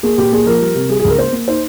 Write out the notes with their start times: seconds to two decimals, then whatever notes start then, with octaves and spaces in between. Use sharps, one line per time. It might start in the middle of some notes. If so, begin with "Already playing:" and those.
0.03 A#3 G#4
0.18 A#2 G4
0.32 A#3 G#4
0.46 F3 A#4
0.61 G3
0.75 C3
0.89 G3 G#4
1.00 G#4
1.05 C#2 A#4
1.18 A#3 C5
1.32 A#3
1.48 D#4 C5